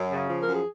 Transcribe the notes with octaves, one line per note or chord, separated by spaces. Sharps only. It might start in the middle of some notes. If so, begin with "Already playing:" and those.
Already playing: F#2
C#3
F3
F#2 A#4
G#4